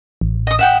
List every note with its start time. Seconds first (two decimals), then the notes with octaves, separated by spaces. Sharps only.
0.21 A1
0.47 D#5 D#6
0.59 E5 F#5 G5